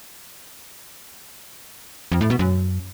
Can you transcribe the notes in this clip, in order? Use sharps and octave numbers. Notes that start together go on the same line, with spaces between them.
F2
A2
B2
F#2